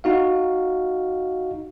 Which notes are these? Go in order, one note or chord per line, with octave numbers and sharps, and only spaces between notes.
D#4 F#4 F5